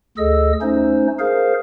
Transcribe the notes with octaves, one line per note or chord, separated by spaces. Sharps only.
D2 G#4 A4 D#5 E6
A3 C#4 D#4 C5
G#4 A#4 C5 F5